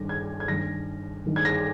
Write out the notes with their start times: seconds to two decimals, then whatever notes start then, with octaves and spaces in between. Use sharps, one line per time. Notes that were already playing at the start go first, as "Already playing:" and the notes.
Already playing: G2 D#3 A#6
0.09 G#6
0.40 G#6
0.48 G2 D#3 A#6
1.26 G2 D#3
1.36 G#6
1.45 A#6